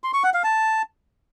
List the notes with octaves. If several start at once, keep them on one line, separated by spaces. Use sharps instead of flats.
C6
C#6
F#5
F5
A5